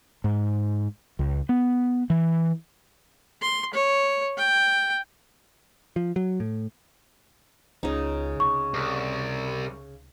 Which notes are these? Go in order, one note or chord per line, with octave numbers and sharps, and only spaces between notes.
G#2
C#2
B3
E3
C6
C#5
G5
F3
F#3
A2
C#2 C#3 D#4
C#2 C3 C#6
C2